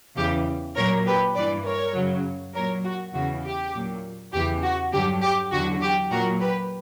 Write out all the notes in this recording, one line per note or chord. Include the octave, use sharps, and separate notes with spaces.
E2 C#3 E3 G4
A#2 F#3 A#4 C#5
G4 B4
G2 E3 B4 D5
A#4 C#5
F#2 C#3 F#3
A#2 F#3 A#4 C#5
F#4
E2 C#3 E3 F#4
G4
A#2 F#3
E2 C#3 E3 G4
F#4
G2 D3 F#3 G4
G4
E2 D3 F#3 F#4
G4
A#2 F#3 F#4 A#4
G4 B4